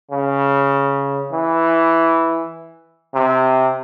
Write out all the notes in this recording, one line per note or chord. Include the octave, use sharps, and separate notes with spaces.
C#3
E3
C3